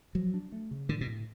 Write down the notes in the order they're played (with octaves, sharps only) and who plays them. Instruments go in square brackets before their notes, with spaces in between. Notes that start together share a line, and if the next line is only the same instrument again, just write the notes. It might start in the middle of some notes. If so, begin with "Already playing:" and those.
[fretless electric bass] F3 [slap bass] F#3
[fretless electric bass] D4
A3
C#3
[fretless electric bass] A2 [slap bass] D3
[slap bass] B2
[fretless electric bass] A2